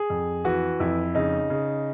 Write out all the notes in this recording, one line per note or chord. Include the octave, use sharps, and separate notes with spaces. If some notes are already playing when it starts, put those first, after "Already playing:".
Already playing: G#4
F2
E3 F#4
F2 E4
C#3 D#4
C#3